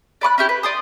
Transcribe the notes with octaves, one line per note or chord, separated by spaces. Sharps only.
D5 B5 C#6 F#6
C#4 E4 G4
B4
D5 C6 D#6